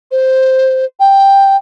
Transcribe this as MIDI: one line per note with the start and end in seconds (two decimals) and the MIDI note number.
0.11 0.85 72
1.00 1.57 79